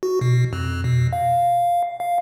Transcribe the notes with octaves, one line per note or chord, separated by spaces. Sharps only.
F#4
B2
F2
B2
F5
F5